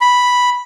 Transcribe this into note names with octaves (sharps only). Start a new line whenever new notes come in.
B5